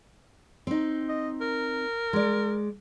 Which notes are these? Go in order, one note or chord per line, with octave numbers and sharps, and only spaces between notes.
C4 D#4
D#5
A#4
G#3 D5